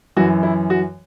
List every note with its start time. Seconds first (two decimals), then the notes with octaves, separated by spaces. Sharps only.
0.17 F#2 E3 F#4
0.43 E4
0.70 F#4